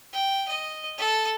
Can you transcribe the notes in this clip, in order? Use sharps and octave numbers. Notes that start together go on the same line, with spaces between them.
G5
D#5
A4